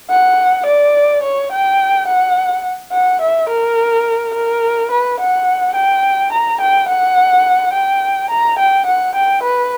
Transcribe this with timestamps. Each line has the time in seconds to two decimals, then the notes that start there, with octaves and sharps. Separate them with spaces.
0.10 F#5
0.66 D5
1.23 C#5
1.52 G5
2.07 F#5
2.92 F#5
3.21 E5
3.49 A#4
4.34 A#4
4.91 B4
5.20 F#5
5.75 G5
6.32 A#5
6.61 G5
6.88 F#5
7.73 G5
8.30 A#5
8.59 G5
8.86 F#5
9.15 G5
9.43 B4